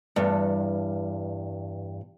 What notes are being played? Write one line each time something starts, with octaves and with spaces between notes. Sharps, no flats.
E2 G2